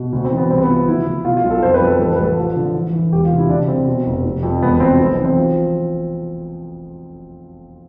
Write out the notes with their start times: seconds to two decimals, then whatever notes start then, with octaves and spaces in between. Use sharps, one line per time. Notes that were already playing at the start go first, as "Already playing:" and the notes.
Already playing: B2
0.13 D2
0.25 C4
0.32 E3
0.38 B3
0.49 C2 C4
0.62 B3
0.68 F3
0.87 D2 E4
1.06 D2
1.25 B2 F4
1.37 F4
1.44 B1
1.50 A4
1.62 F2 C5
1.74 B4
1.81 F2
1.87 A4
1.99 A1 A4
2.13 B4
2.18 A1
2.24 A4
2.37 F3
2.56 D3
2.75 E3
2.93 E3
3.12 E1 G4
3.25 F4
3.31 C3
3.38 E4
3.49 D2 D4
3.68 D3 C4
3.87 B2
4.06 F1
4.24 F1
4.43 F2
4.62 E1 B3
4.80 D2 C4
5.00 B1 B3
5.13 C4
5.18 E3
5.25 C4
5.37 F3